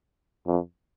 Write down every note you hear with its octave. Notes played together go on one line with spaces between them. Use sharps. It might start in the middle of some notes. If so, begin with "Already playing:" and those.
F2